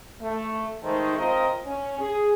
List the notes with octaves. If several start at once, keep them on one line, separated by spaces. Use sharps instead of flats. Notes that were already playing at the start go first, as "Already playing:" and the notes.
A3
D#3 G#3 A3 D#4 C5
C4 F4 A#4 D#5
C#4
G#4